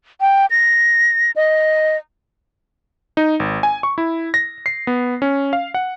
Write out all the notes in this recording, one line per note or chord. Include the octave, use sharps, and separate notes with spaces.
G5
A#6
D#5
D#4
G#1
G#5
C#6
E4
A#6
C7
B3
C#4
F5
F#5